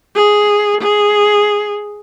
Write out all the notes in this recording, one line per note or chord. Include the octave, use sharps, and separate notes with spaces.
G#4
G#4